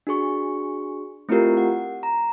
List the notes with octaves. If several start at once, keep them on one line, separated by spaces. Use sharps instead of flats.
D4 F#4 G#4 C#6
A3 C4 E4 F4 G4 A#4
F#5
A#5